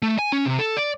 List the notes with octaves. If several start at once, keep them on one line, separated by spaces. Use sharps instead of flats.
A3
G#5
C#4
C3
A4
D5